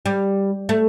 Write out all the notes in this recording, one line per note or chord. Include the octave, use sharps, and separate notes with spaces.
G3
A3